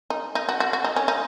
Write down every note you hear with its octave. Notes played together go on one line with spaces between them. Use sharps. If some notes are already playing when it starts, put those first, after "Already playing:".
D#4
D#4
F#4
F#4
F#4
D#4
C#4
D#4